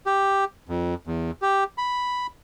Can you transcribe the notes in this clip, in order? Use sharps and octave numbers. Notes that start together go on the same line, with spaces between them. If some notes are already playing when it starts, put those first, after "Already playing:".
G4
F2
E2
G4
B5